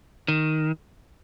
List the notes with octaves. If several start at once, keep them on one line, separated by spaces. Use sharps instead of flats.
D#3